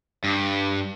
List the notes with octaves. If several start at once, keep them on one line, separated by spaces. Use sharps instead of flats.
G2